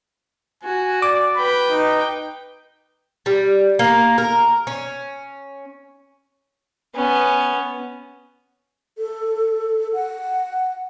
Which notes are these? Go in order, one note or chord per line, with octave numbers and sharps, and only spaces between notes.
F#4 G#5
D5 D6
B4 G5 B5
D#4
G3
A#3
A#4
C#4
B3 C#4
A4
F#5